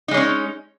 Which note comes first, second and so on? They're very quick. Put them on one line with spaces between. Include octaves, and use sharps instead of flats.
D#4 G#3 C#5 C#4